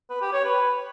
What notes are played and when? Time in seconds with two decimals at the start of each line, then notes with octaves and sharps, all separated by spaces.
0.10 B4
0.22 G4
0.33 C#5
0.45 B4